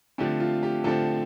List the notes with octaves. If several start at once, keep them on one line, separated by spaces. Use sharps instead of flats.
D3 F3 A3 C4 G4
F4
G4
D3 F3 A3 C4 A4